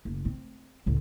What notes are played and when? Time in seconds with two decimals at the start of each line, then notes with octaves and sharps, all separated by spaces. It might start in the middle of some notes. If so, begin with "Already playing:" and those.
0.05 F#1
0.25 C4
0.86 C#2 A2